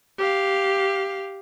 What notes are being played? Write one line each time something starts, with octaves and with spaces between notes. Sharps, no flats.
G4 F5